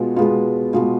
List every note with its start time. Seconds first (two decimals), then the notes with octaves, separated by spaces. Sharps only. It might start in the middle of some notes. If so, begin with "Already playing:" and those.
Already playing: B2 G#3 B3 F4
0.16 B2 G#3 B3 F4
0.74 B2 G#3 B3 F4